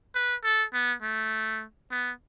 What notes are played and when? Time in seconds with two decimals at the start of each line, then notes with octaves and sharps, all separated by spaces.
0.15 B4
0.44 A4
0.73 B3
1.02 A3
1.91 B3